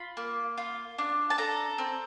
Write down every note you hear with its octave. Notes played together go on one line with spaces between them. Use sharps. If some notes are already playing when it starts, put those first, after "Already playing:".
Already playing: F4 B5
A#3
F4
D4
A5
A4 A#5
C4